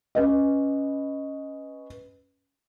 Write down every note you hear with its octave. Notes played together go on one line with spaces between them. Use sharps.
C#4 B4 D#5